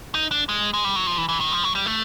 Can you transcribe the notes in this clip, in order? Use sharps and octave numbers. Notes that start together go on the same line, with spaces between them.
D#4
D4
G#3
G#3
G3
F#3
F3
E3
E3
D#3
F3
F#3
G3
A3